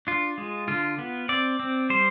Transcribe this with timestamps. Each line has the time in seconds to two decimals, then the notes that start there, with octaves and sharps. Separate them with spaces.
0.07 D4 F4
0.38 G#3
0.68 D3 F4
0.98 B3
1.29 C4 D5
1.60 C4
1.90 G3 C5